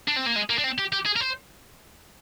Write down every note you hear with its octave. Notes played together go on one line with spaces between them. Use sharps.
D4
C4
A#3
G#3
A#3
D4
C4
G4
G4
G#4
A#4
C5